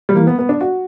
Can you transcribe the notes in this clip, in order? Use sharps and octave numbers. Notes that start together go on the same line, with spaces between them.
G3
E3 A#3
B3
B3
D4
F#4